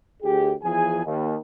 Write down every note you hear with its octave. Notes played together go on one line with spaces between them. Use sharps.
D2 G4 G#4
E2 F3 G#4 G#5
D#2